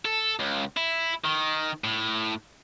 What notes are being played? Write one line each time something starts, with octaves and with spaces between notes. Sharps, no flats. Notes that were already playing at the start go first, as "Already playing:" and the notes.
A4
C#2
E4
D#3
A2